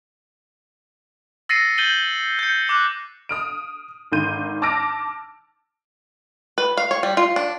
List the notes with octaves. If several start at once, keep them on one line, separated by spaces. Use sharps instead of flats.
E6 A6 A#6 C7 C#7 D#7
G6 A6 D#7 F#7 G7
G6 C#7
D6 F#6
D#6 F6 D7
G#1 D3 D#3 C6 G6 D#7
A5 D6 E6 F6 A#6 D7
B4
F5
C#5
G3
F4
D4